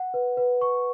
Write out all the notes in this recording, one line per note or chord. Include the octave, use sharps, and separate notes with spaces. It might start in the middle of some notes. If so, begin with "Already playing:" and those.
Already playing: F#5
B4
B4
C#6